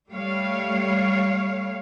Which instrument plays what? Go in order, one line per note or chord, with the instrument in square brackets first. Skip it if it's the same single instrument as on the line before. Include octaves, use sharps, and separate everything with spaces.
[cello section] G3 A3 C#5 F5